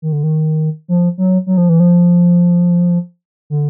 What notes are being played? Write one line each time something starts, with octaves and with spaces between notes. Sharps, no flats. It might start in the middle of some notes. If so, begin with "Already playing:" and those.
D#3
D3
D#3
F3
F#3
F#3
F3
E3
F3
D3